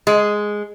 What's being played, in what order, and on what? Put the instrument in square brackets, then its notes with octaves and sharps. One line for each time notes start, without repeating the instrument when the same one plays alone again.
[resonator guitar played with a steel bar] G#3